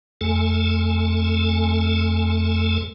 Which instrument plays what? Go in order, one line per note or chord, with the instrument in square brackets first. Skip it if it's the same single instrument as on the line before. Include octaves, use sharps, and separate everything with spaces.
[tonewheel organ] F2 A3 A4 G#5